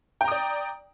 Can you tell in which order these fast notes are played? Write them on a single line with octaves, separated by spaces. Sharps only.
G5 A#5 D#6 D5